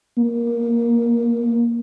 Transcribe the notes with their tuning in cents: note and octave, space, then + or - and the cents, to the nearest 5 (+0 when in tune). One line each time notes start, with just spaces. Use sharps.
A#3 +10